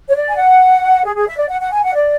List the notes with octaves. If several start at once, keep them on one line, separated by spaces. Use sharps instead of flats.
C#5
D5
G#5
F#5
G#4
G#4
E5
D5
F#5
F#5
G#5
F#5
D5